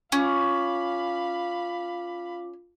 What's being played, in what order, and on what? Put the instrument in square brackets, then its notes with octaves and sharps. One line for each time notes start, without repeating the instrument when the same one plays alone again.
[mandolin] C#4 [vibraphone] F4 D6 [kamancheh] F5 B5